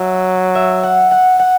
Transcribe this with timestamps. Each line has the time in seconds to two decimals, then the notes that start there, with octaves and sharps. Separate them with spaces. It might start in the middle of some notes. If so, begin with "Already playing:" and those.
Already playing: F#3 E5
0.55 E5
0.83 F#5
1.11 F#5
1.39 F#5